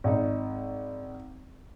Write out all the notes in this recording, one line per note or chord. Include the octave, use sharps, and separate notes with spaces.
G#1 D#4